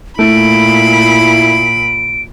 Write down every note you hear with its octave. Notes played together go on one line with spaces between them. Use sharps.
A#2 A3 E4 B5 D7